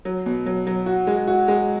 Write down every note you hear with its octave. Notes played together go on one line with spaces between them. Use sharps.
F#3
B2
F#3
F#3
F#4
G#3
F#4
G#3